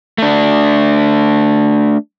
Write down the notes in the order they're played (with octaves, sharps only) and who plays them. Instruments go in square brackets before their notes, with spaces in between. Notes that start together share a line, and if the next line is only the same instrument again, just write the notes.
[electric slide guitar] A3 D4